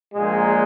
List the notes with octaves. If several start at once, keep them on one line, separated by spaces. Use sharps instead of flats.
A#1 A#2 G#3